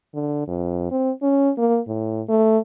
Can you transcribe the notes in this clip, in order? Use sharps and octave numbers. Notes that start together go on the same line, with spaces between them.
D3
F2
C4
C#4
A#3
A2
A3